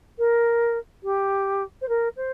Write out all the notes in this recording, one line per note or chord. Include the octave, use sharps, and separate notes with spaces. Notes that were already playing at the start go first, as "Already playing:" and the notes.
A#4
G4
C5
A#4
C5